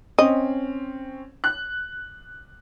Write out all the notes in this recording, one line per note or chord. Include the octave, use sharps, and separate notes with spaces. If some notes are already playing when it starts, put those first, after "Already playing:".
C4 C#4 D#5
F#6